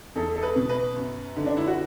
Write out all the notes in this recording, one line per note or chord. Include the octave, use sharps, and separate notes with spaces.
E2 A4
A4
B4
B2
B4
F#2
D3
D4
E4
F#4